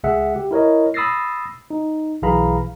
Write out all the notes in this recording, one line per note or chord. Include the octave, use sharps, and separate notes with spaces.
C#2 G#4 E5 F#5
G4
E4 A#4 C#5 D#5
B5 D#6 E6 A6 A#6 C7
D#4
B1 E3 G#4 F5 A#5 B5